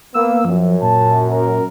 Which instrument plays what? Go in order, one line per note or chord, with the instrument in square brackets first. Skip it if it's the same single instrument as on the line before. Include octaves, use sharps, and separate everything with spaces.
[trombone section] A#3 B3 [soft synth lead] E6
[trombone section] F#2 [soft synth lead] F3
[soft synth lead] A#2 [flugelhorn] A5
[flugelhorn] A#4